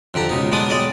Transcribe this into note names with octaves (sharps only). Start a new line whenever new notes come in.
F2 D3 G4 A#5
C#2 B2 D#4
B1 G#3 B3 D4 D6 D#6
B1 G#3 D5 D#5 G5